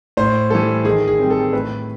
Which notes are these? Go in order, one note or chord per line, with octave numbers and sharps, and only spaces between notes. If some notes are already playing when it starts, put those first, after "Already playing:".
A2 C5
E3 G3 A4
D#3 G#4
G#4
G3 C4
A4
A2 B4